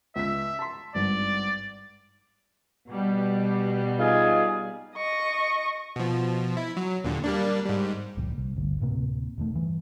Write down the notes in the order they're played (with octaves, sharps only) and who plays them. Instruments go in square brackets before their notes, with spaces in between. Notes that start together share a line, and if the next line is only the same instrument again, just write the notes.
[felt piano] C#2 B6 [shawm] E5
[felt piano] A5 C6
[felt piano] G#1 G2 [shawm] D5
[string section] B2 G3
[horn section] D#4 F4 G#4
[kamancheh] D#5 C#6
[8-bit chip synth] B2 F3
E4
F#3
D#2 A#2 D3
G3 A#3 D4
G#2 G3
[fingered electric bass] F#1 C#2 A#2 F3
C2
G1 D2 G2
D1 A2 C3 A#3
E1 D#3 A3
G2 E3